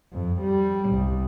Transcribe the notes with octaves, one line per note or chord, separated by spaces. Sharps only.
F2
G3
C2